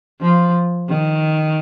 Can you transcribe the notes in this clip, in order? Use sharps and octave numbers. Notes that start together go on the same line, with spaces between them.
F3
D#3